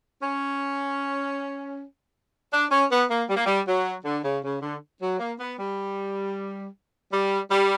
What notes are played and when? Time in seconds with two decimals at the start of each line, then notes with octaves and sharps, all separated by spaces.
0.21 C#4
2.52 D4
2.71 C#4
2.90 B3
3.09 A#3
3.29 G3
3.36 A#3
3.46 G3
3.67 F#3
4.04 D3
4.24 C#3
4.43 C#3
4.62 D3
5.01 F#3
5.20 A#3
5.40 B3
5.59 G3
7.12 G3
7.51 G3